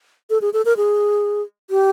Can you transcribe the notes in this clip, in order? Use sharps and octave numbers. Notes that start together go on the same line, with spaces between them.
A4
G#4
A4
A#4
G#4
G4